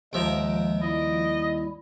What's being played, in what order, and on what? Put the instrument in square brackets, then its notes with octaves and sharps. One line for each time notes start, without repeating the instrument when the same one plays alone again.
[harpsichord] D#2 E5 A#5 [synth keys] F3 D7 [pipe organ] G#3
[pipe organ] G3 E4 [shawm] D#5